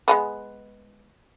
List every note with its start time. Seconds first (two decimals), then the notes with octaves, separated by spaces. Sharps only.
0.08 G#3 A3 B3